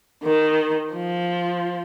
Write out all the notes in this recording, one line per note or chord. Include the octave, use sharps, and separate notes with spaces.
D#3
F3